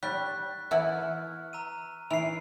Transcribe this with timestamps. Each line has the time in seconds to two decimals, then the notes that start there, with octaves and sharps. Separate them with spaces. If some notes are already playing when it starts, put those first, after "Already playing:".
0.03 G3 C#6 F#6 B6
0.71 E3 B3 E4 F6
1.53 A#5 E6 D#7
2.11 E3 C7 D7 F7